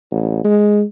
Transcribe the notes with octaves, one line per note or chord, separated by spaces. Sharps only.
A1
G#3